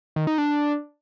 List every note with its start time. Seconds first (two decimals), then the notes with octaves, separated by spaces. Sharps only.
0.16 D#3
0.27 D#4
0.38 D4